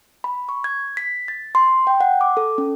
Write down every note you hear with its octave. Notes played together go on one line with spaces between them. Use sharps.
B5
C#6
G#6
B6
A6
C6
G5
F#5
D6
A4
C#4